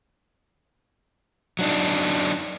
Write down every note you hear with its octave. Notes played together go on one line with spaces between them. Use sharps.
F#3 D4 D#4